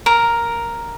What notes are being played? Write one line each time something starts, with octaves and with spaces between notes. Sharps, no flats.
A#4